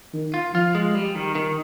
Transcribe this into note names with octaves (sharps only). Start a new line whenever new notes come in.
D#3
F4
F3 F4
G#3
G3
D#3
D#3